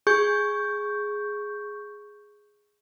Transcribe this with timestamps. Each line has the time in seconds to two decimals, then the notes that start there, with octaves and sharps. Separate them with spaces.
0.07 G#4 C#6 G6